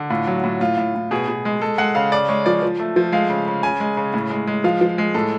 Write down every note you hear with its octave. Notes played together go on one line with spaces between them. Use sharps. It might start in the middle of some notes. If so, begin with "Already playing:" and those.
Already playing: D3
A2 F4
F#3
A2
A2 F4
A2
A2
B2 G#4
B2
G#3
G#3 A4
G#3 F#5
C#3 F5
C#3 D5
G#3 C#5
F3 D5
F3
A3
F3
G#3 F5
C#3
C#3
C#3 G#5
G#3
C#3
A2
G#3
G#3
F3 F5
F3
G#3
A2 A4